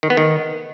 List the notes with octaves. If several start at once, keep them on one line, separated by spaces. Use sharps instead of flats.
D#3
B3
D#3